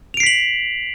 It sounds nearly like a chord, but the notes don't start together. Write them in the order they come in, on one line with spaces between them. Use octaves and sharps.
F7 D7 C7 B6 F#7